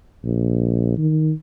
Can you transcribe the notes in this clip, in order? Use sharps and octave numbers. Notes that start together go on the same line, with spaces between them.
A#1
D#3